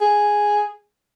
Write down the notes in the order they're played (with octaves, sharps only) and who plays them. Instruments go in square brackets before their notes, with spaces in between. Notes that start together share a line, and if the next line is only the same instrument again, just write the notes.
[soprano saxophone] G#4